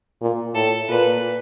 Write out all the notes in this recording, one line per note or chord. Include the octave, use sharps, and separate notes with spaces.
A#2
A2 A4
A#2 B4